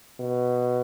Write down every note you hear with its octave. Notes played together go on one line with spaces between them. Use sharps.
B2